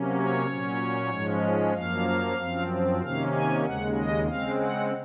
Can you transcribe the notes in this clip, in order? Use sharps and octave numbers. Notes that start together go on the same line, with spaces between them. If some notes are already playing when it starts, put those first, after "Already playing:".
Already playing: C3 F#3 A#3 C#4
C#5
A#2 F#3 C#4
G#2 F3 G#3 C#4
F#2 F3 A#3 F5
F#2 F3 C4
C3 D#3 A#3 C#4 F5
G#5
D#2 C#3 G#3 F#5
D#5
C#3 G#3 C4 F5
F#5